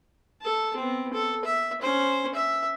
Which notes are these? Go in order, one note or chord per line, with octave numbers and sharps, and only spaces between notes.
A4 A5
B3 C4
A4
E5
C#4 C5
E5